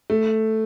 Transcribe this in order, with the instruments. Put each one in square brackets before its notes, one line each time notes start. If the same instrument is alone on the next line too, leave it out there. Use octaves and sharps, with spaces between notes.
[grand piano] A3